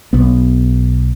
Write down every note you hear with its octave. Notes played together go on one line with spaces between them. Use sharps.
B1 B3